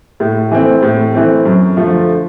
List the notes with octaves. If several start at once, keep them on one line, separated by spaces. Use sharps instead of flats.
A2
E3 A3 C4
A2
E3 A3 C4
F#2
D3 F3 A3